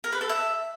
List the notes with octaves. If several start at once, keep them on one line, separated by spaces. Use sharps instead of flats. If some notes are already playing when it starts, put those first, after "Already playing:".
A#4
B4
A4
E5